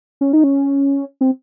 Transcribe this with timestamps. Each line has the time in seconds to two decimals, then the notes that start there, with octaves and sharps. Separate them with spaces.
0.21 C#4
0.33 D#4
0.44 C#4
1.21 C4